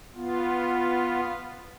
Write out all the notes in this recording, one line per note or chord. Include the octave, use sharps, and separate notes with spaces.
B3 F4